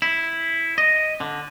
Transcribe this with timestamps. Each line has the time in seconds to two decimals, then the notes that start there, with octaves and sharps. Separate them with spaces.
0.02 E4
0.78 D#5
1.21 D3